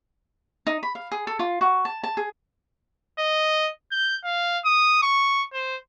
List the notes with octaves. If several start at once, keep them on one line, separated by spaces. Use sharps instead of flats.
D#4
B5
F5
G#4
A4
F4
F#4
A5
A5
G#4
D#5
G6
F5
D#6
C#6
C5